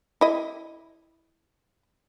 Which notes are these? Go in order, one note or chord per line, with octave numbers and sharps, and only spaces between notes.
E4 D#5